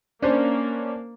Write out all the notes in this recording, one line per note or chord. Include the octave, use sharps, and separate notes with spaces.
A#3 C#4 D4 C5